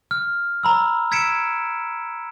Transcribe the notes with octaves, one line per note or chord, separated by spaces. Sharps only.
F6
A#5 B5 E6
E6 G#6 B6 C#7 D7 E7